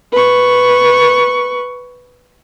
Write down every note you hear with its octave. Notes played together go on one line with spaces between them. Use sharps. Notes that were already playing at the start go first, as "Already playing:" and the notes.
B4 C#6